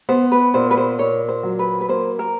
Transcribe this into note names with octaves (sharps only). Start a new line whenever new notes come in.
B3 C5
B4
A#2 C5
B4
C5
A#2 C#5
C5
F#3
B4
B4
A#3 C5
A#4